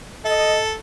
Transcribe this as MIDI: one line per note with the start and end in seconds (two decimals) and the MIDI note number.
0.25 0.73 69
0.25 0.59 75